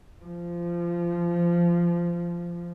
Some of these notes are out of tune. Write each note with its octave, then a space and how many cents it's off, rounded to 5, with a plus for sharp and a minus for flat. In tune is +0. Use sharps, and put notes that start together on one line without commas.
F3 -20